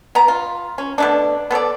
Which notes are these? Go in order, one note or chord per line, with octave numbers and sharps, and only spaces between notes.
B3 A#5
F4
C#4
B2 A3 D4
B3 A4 C#5 D5